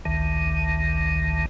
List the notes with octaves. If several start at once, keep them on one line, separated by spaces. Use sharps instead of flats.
A1 D2 D#3